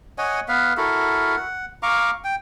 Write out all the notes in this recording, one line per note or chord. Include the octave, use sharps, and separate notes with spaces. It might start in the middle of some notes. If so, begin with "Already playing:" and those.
C#5 D#5 F#5 G#5
B3 B4 F5
E4 F#4 A4 A#4
F#5
F5 A#5 C#6 D6
G5